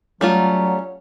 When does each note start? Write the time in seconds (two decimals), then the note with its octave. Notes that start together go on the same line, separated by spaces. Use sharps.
0.21 F#3 G3 A3 C#4 F4 F#5 A#5